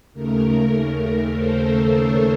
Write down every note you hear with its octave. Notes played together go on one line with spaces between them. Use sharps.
D#2 C#3 A3 A#4
A#4
A4 C5
A4 C5
A#4 C#5